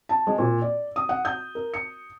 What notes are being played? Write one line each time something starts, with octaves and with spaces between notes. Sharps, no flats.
A5
G#3
A#2
D5
D#6
F#5
G6
A#4
C#7